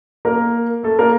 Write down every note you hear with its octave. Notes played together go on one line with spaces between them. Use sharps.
A#3 A#4
A3 A4
A#3 A#4